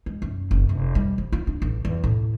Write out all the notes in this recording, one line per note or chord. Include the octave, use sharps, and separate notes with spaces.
G#3
F#2
F#1
F1
G3
F3
F4
D4
A1
E2
A2